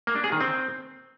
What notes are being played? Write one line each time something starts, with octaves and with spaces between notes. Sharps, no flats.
A#3
D4
G#4
D#3
C4